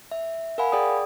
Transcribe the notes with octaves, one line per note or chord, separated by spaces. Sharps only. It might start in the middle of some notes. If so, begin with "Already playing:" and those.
E5
A#4 F5 F#5 G#5 B5
G#4 D5 G5 D#6